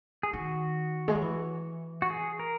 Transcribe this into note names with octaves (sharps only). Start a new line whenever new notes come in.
G#4
D#3 F#4
G#3
F#3
E3
F#4
G#4
A#4